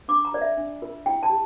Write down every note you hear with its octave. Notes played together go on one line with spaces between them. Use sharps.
D4 D6
A#5
F4 A#4 D5
E5
D4
F4 A#4
E4 G5
A5
G4